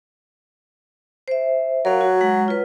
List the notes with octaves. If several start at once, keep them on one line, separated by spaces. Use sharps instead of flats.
C5 E5
F#3 A#4 F5
F#4
G#3 F#5
F4 B4